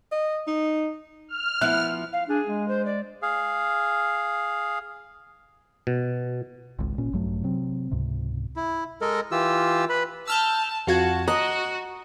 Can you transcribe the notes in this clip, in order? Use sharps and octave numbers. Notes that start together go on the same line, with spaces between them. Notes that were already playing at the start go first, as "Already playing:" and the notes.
D#5
D#4
F6
F3 B3 E4 F#6
F5
D4 G#4
G#3
C5
D5
G#4 F5
B2
G#1 C#2
A#2 C#4
A#1 G2 F#3 A3
C3 F#3 C4
C#2 G#2 C3
E4
G#3 A4 A#4 D#5
E3 F4 G4 E6
B4 B5
A5 E6 F6 G6
F2 F4 F#4 A5 G#6
F#4 D#5 A#5 F#6